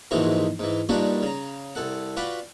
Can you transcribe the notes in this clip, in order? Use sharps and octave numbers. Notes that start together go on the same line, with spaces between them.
A#1 G#2 C3 D#3 E3 F#4
G#2 E3
G2 A#2 G3 D4 D#4 F#4
C#3 A#5
C2 A4 F#5
F4 F#4 B4 D5 G5